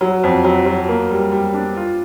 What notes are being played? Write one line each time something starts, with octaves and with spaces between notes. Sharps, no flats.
F#3
F2
F#3
F#3
A#3
G3
G3
D4
F4